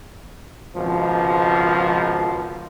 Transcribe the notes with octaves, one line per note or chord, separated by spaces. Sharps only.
G#1 C#2 B2 F3